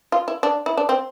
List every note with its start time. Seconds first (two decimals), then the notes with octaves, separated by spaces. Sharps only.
0.12 F4
0.28 E4
0.43 D4
0.66 E4
0.77 D4
0.89 C4